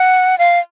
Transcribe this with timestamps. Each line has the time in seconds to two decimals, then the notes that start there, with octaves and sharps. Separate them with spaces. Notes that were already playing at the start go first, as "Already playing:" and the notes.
Already playing: F#5
0.38 F5